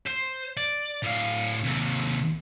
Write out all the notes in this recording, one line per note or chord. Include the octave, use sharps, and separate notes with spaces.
C5
D5
A2 F5
D#2 C3